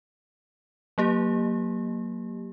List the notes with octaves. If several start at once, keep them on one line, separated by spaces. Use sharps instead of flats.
F#3 A#3 G4